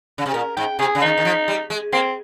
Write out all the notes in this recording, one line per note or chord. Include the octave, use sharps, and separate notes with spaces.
C#3
C3
A#2 A#4
G#2 G5
C3 G#4
C#3
D#3 D#4
D#3
F3
G3
G#3
A#3 C4